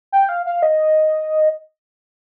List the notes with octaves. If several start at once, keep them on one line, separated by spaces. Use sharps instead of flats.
G5
F5
F5
D#5